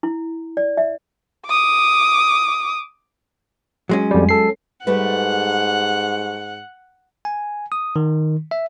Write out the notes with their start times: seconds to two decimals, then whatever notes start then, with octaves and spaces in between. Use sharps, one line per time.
0.03 E4
0.57 D5
0.77 E5
1.47 D6 D#6
3.89 F#3 G#3 C#4
4.11 F2 G3
4.29 A4 C7
4.87 G#2 G3 A3 B4 F#5
7.25 G#5
7.72 D#6
7.96 D#3
8.51 E5